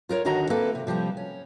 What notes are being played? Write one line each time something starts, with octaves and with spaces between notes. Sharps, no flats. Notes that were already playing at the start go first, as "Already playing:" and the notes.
F4 A#4 B4 C#5
D#2 D3 D#3 F#4 D#5 A#5
A#3 C4 E4 A4 B4
C3
C3 F3 G3 G4
C#4